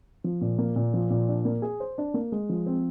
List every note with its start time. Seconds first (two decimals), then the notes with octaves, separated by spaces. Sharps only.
0.24 F3
0.41 A#2
0.58 A#3
0.76 A#2
0.94 F3
1.10 A#2
1.28 D4
1.45 A#3
1.62 G#4
1.80 C5
1.98 D4
2.14 A#3
2.32 G#3
2.49 F3
2.66 C4